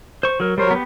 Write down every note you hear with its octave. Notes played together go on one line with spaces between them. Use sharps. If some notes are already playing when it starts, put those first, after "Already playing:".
C5 C#6
F#3 A#4
F#3 G3 A#4 C5 C#5
B3 G4